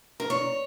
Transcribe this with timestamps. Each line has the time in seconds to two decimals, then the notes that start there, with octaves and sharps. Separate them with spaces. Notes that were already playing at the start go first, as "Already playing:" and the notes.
0.20 A#4
0.30 C#5